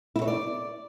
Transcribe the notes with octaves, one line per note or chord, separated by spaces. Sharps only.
E4
C#5
D5